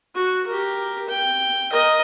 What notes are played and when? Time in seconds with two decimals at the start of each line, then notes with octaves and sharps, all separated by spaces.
0.15 F#4
0.47 G4 A#4
1.09 G5
1.72 A#4 D#5